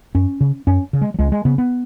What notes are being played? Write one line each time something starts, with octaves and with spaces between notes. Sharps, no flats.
F#2 C#4
C#3
F#2 C#4
C#3
G#3
F#3
C#2 G#3
G#3
C#3 B3
B3